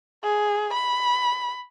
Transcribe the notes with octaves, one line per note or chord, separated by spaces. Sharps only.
G#4
B5